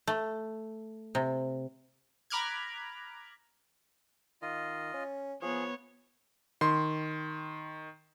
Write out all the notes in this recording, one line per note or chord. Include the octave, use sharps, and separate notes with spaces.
A3
C3
A#5 B5 D6 F6 F#6 G#6
D#3 F4 D#5
C#4
F3 B3 G#4 C#5
D#3 C6